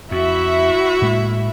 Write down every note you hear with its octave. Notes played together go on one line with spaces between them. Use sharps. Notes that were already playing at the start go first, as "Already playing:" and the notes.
F2 E4 F#4 E5
A2 G#3 A#3